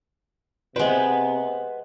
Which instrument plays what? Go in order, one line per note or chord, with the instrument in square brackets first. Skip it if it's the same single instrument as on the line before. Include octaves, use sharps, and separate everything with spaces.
[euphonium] C3 [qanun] G#3 G5 [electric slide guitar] B4 F#5 [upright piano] C5